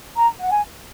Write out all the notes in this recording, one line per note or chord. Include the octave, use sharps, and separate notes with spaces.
A#5
F#5
G#5